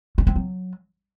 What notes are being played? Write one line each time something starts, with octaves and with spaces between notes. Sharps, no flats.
C#4
C4
F#3